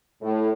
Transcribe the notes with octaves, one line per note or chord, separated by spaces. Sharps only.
A2